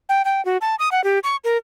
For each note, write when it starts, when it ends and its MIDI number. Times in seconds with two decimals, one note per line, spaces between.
0.09 0.22 79
0.25 0.44 79
0.45 0.57 66
0.61 0.75 81
0.79 0.89 87
0.92 1.03 78
1.04 1.19 67
1.24 1.36 85
1.44 1.57 70